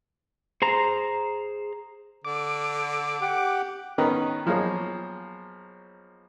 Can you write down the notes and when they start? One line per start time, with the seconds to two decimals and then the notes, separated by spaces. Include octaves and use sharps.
0.62 G#4 C5 A#5
2.25 D3 D6
3.22 G4 F#5
3.98 D#3 B3 C#4 D#4 B4
4.46 B1 F3 A#3 G#4 C#5